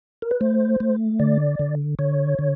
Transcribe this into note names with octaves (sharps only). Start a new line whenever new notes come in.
A#4
B4
A3 C5
A3
D3 D5
D3
D3 C#5
D3